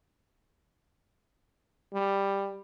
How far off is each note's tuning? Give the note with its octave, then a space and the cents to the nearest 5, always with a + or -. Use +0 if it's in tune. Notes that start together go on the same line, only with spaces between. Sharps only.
G3 +10